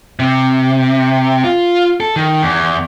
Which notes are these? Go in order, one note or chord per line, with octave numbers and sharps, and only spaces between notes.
C3
F4
A4
D#3
E2